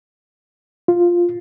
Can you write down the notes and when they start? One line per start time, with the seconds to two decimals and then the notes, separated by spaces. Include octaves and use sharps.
0.88 F4